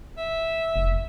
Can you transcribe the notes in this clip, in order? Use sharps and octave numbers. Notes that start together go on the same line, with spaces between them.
E5
F1